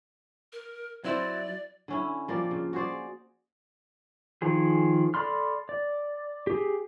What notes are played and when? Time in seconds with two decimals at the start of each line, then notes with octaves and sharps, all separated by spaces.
0.53 A#4
1.05 F#3 C4 E4 C5 D5
1.88 D3 C#4 E4
2.28 F3 A#3 C4 D5
2.51 C#3
2.73 F#4 G#4 C5 D5
4.42 D#3 F3 G#4
5.14 A4 D5 B5 C6 F6
5.69 D5
6.47 G4 G#4